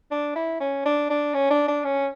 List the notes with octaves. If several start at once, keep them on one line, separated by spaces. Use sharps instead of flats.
D4
E4
C#4
D4
D4
C#4
D4
D4
C#4